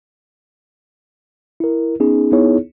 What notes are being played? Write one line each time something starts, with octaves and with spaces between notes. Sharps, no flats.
E4 A#4
B3 C#4 D#4 G#4
B3 D#4 E4 G#4 C#5